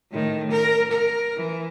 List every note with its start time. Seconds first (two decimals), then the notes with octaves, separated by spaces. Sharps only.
0.11 A2 D#3
0.51 A#4
0.91 A#4
1.36 E3